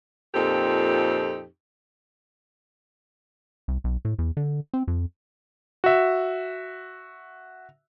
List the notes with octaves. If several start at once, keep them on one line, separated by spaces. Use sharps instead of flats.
F2 A#2 C4 D#4 G4 A4
C2
B1
A2
E2
D3
C4
F2
F#4 E5